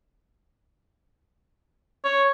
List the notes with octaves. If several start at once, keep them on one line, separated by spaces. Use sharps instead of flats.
C#5